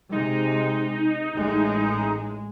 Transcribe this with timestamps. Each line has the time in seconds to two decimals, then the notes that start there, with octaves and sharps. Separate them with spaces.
0.12 C3 G#3 D#4
1.36 A1 A2 G#3